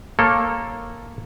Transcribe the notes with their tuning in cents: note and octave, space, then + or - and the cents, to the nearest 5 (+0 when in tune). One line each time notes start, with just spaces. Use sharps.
A#3 +0 A4 +0 C#5 -20